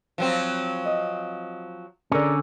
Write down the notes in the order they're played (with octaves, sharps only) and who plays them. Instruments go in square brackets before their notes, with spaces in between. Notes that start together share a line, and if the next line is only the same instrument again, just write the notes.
[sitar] F3 F#3 C4
[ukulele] D#5
[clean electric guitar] D3 C#4 [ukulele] G#4 A#4 D5